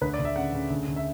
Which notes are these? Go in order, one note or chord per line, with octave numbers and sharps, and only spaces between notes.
D2 B4
D5
D2
E5
C#3 F#5
C#3
D2
D2
E5